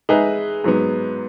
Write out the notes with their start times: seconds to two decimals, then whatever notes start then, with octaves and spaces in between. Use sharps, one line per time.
0.09 G#3 D#4 G#4 B4 E5
0.64 G#2 F#3 B3